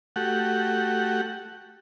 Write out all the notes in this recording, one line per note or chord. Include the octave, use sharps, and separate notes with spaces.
A3 F#4 G4 F#5